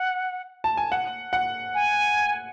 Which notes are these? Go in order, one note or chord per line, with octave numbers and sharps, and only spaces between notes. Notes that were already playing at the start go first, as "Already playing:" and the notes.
Already playing: F#5
A5
G#5
F#5
F#5
G#5